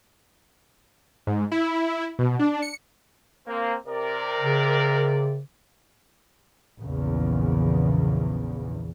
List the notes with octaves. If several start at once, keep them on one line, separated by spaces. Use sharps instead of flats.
G#2
E4
B2
D4
C#7
A#3 C4
C3 A#4 D5
C#3
A#1 E2 C#3